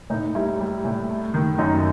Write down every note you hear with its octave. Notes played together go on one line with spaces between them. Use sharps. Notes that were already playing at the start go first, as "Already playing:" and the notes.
A2 D#4
G3 E4
G3
A2
A3
D#3
F#2 D#4